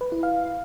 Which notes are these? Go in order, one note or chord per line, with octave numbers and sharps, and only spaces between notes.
B4
E4
F5